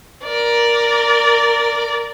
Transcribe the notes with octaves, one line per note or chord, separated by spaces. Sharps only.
A#4 D5